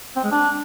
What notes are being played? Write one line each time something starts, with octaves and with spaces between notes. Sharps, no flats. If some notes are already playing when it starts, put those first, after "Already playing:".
C4
G#3
D4